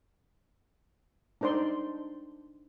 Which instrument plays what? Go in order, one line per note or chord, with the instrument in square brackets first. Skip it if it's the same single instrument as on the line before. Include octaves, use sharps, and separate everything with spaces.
[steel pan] D4 D#4 C5 D5 C6